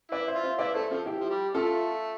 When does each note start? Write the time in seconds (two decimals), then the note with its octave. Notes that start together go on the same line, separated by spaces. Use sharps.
0.12 E4 B4 D5
0.27 C5 E5
0.35 F4
0.43 C5 E5
0.59 E4 B4 D5
0.74 A3 A4 C5
0.90 F3 F4 A4
1.06 E4 G4
1.21 F3
1.30 G3
1.54 A3 F4 A4